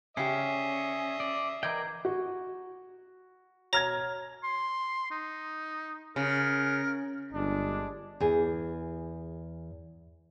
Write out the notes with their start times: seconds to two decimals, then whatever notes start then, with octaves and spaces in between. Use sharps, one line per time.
0.17 C#3 C#4 G4 E5 D#6 C7
1.20 D5
1.63 E3 A#4 D5 D#5 G5 G#6
2.05 F#4
3.73 B2 C#5 A#5 F6 G#6 A#6
4.43 C6
5.11 D#4
6.16 C#3 A#4
7.33 G1 G#3 D4
8.20 E2 G#4